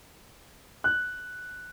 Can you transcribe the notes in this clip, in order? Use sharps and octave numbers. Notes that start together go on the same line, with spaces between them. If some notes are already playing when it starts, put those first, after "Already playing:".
F#6